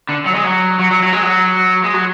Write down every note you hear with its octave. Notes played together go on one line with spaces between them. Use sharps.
D3
F#3
G#3
F#3
F#3
F#3
F#3
G#3
F#3
G#3
F#3